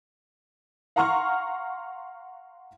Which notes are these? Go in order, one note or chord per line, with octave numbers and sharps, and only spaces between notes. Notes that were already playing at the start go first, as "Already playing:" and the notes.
F5 F#5 A#5 C6 C#6 F6